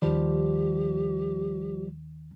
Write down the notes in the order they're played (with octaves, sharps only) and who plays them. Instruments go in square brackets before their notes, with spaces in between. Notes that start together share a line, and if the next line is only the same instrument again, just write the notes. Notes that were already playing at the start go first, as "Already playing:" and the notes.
[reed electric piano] D#2 D#3 [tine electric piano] F3 G3 [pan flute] G4